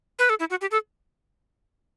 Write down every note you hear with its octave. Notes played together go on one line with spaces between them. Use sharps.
B4
A4
E4
F#4
G4
A4